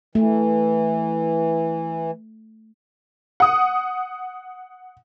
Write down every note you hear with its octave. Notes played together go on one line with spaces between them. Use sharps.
E3 A3
F#5 D#6